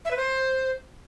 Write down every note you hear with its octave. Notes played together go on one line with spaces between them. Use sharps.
E5
B4
C5